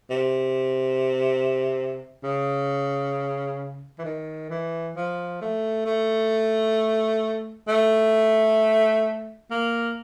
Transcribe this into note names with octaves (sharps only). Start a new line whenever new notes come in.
C3
C#3
E3
D#3
E3
F3
A3
A3
A3
A#3